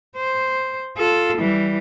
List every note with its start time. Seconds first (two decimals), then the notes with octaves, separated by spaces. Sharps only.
0.17 C5
0.98 F4 A4
1.37 E3 G3